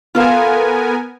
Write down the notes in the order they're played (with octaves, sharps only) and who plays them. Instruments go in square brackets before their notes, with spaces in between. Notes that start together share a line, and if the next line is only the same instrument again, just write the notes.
[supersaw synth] B3 A#4 G#5 [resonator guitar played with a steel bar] F4 A4 F5